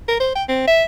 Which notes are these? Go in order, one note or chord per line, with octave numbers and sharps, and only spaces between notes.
A#4
C5
G5
C4
E5